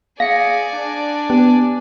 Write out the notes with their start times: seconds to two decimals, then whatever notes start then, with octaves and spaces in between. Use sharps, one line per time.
0.20 G#4 D5 F5 G#5 A#6 C#7
0.74 D4
1.30 B3 G4